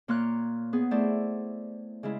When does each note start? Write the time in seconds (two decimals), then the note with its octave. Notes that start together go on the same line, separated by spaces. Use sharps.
0.08 A#2 A#3 C#5 C6 F6 F#6
0.73 B3 G#4
0.91 A3 E4 C5 D5
2.03 C#3 G#3 E4